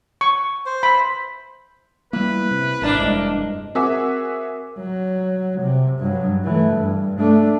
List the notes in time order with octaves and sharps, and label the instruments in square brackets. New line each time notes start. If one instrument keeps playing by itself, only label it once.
[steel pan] C#6
[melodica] C5
[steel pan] B5
[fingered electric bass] G3 A#3 [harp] E4 [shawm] B4
[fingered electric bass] C3
[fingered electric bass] G#1 [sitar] A#3 D4 [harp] C5 E5 A5
[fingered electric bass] F1 G2 [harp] G#3 D#5
[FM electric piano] C4 [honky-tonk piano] F#4 G#4 E5 [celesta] A#4 D6
[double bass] F#3
C3
G2 F#3
E3 A3
G2
A3 D4